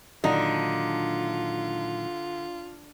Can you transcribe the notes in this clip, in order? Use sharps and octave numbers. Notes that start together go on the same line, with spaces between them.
A#2 D3 D#3 F#3 D#4 F4